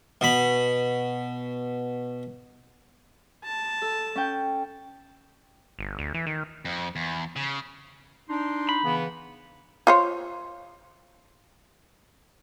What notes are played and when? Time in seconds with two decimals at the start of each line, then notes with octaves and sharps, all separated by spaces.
0.21 B2 B5
3.44 A5
3.82 A4
4.15 C#4 G5
5.79 G1
5.99 D2
6.14 E3
6.27 D#3
6.65 F2
6.96 E2
7.36 C#3
8.29 D4 D#4 C6
8.69 B5
8.84 C#3 E3 B3
9.87 F4 C5 C#5